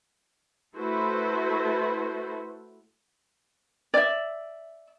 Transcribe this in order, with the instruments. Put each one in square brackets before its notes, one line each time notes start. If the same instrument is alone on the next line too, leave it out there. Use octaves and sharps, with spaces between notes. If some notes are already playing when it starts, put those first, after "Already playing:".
[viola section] A3 E4 F#4 A4 B4 C5
[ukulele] D5 E5